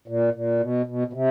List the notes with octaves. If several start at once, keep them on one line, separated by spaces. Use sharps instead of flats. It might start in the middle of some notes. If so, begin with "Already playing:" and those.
A#2
A#2
B2
B2
B2
C3